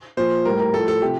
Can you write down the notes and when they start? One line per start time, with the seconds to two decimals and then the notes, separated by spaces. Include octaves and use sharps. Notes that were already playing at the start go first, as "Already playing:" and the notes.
0.17 A#2 F3 C5
0.45 A2 G3 A#4
0.60 A#4
0.74 A2 F3 A4
0.88 A4
1.02 C3 F3 G4